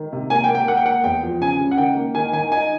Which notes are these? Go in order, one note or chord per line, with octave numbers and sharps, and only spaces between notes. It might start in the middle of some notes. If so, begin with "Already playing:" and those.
Already playing: D#3
C3
A#3 G#5
G5
A#3
G5
A#3 F#5
G5
A#3 F#5
E2 G5
F3
C#3 G#5
C#3
F#5
D#3 G5
A#3
D#3 G#5
D#3 G#5
D#4 G#5